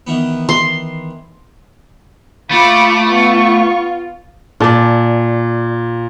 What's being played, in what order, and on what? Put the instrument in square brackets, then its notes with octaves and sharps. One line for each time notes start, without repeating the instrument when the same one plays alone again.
[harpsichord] D#3 E3 B3
[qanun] C6
[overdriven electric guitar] A3 [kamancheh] F4 [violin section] B5 D6
[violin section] B3 C#6 [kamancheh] F4
[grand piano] A#2 [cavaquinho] D5 A5